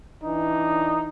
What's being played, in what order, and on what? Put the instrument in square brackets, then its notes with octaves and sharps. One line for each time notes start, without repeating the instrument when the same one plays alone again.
[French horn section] E3 D4 [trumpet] D#4